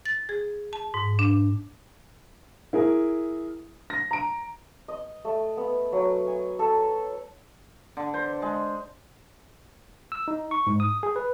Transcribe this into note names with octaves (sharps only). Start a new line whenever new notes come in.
A6
G#4
A5
G#2
D4
E4 G#4 A#4
A#6
A#5 D7
D#5
A3
B3
F#3
G#5
A4
D3
C5
G#3
E6
D#4
C#6
G#2
D#6
G#4
B4